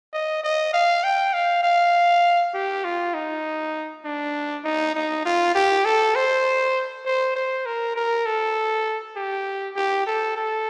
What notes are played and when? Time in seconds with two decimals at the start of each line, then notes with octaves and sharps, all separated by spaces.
0.14 D#5
0.43 D#5
0.74 F5
1.04 G5
1.34 F5
1.64 F5
2.54 G4
2.84 F4
3.14 D#4
4.05 D4
4.64 D#4
4.95 D#4
5.25 F4
5.55 G4
5.85 A4
6.15 C5
7.05 C5
7.36 C5
7.66 A#4
7.96 A#4
8.26 A4
9.16 G4
9.76 G4
10.07 A4
10.36 A4